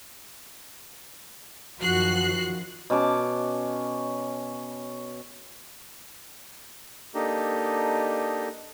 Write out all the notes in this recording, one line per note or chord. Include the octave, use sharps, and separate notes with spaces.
F#2 D#3 F3 F#4 F#6 C7
B2 C#4 A5 D6
A#3 D4 D#4 G4 A4 D#5